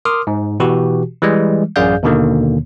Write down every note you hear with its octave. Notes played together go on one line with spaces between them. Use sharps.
A#4 C6 D6 D#6 F6
G#2
B2 E3 F#4 G4
E3 G3 G#3
A1 F#2 G#4 D5 F5 G6
D#2 B2 D3 D#3 A#3